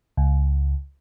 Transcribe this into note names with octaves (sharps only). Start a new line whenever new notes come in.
C#2